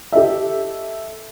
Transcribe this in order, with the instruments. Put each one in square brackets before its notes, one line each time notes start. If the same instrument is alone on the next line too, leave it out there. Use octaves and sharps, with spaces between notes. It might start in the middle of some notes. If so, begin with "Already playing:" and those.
[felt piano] G4 A4 D#5 E5